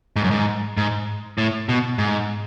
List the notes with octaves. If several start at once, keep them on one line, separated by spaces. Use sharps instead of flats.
G#2
F#2
G#2
G#2
A2
B2
G#2